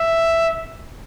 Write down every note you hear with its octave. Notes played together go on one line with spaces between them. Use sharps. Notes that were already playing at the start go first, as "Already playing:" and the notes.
Already playing: E5